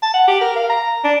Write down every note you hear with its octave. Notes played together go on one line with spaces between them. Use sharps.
A5
F#5
G4
A#4
F5
A#5
D4